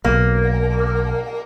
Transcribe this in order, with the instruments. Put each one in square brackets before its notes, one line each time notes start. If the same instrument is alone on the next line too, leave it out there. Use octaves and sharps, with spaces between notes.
[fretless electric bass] B1 [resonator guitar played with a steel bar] A#3